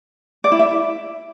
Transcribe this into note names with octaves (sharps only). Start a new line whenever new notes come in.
D5
E4
E5